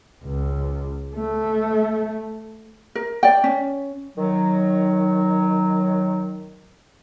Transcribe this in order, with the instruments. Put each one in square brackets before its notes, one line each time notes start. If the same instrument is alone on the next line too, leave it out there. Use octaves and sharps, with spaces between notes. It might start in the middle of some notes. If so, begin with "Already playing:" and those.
[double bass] C#2
A3
[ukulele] A#4
D5 G5
C#4
[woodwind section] D#3 F#3